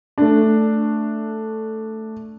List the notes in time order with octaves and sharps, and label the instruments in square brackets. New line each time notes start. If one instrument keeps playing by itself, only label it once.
[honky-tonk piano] A3 D4